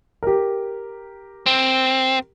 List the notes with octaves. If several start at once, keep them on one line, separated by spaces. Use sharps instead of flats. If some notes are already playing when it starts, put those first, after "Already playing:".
G4 A#4
C4